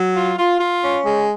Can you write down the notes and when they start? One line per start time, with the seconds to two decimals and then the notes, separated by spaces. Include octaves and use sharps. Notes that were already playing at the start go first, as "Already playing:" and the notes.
Already playing: F#3
0.16 F4
0.38 F4
0.60 F4
0.82 C#4
1.05 G#3